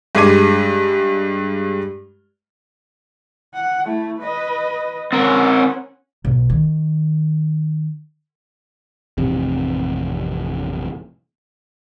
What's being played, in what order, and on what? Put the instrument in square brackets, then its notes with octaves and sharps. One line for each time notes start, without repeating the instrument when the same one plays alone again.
[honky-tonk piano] G2 G#3 D6 G#6 D#7
[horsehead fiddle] F#5
A3 E4
B4 D#5
[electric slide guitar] C4 A#4 [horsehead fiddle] C#4 F#5
[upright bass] B1
D#3
[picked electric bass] A1 F2 C3